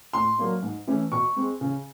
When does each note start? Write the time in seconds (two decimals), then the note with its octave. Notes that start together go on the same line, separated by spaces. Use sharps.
0.13 A2 C6
0.38 F#3 A#3 D4
0.63 G#2
0.87 E3 A3 C#4
1.12 B2 C#6
1.36 G#3 C4
1.61 C#3